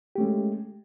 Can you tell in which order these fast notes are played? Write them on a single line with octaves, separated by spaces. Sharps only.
G4 A3 C#4 G#3